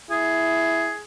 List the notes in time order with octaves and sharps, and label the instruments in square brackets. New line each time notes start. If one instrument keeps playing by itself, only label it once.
[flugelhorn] E4 [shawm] G#4